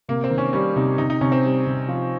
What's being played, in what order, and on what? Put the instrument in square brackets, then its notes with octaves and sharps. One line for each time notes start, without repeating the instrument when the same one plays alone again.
[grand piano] C3 [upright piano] A#3
[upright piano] C4
[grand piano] D#3
[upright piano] C#4
[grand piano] G3 [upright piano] C#4
[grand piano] C3 [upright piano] D#4
[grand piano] C3 [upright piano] D#4
[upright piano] D#4
[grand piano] C3 [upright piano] C#4
[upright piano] C4
[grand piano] G3
C3
F3